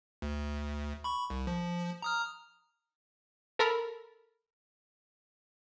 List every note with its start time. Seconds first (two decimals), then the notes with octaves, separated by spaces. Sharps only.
0.22 D2
1.04 B5 C#6
1.30 C2
1.47 F3
2.02 A#5 D#6 F6
3.59 A4 A#4 A#5 B5